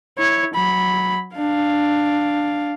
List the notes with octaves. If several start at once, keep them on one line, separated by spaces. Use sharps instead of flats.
E4 C#5
F#3 B5
D4 F5